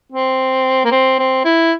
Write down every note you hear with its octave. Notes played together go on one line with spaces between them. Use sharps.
C4
A#3
C4
C4
E4